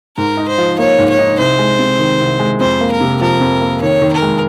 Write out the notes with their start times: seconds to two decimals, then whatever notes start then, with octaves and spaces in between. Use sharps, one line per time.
0.17 G#2 A#4
0.37 D#4
0.48 C5
0.58 F3
0.78 A#3 C#5
0.98 G#2
1.09 C#5
1.19 D#4
1.39 C2 C5
1.59 G#3
1.79 C3
1.99 D#3
2.20 C2
2.39 G#3
2.60 F2 C5
2.81 A#3
2.91 A#4
3.01 C3
3.21 F3 A#4
3.41 F2
3.61 A#3
3.81 D#3 C#5
4.02 D#3
4.12 A#4
4.22 G#3